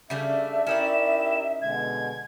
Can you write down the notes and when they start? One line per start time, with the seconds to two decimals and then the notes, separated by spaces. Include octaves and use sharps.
0.10 C#3 G3 A3 D4 E5
0.67 C#4 D#4 E4 G4 A#4 D5 E7
1.62 B2 D3 G#3 G#6